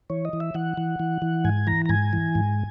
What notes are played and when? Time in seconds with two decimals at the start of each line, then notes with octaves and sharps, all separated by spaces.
0.10 E3 C#5
0.25 D#5
0.33 E3
0.40 E5
0.54 E3 F#5
0.77 E3
1.00 E3
1.22 E3
1.44 G#2 G#5
1.67 E3 A#5
1.86 A#5
1.89 G#2 G#5
2.13 E3
2.35 G#2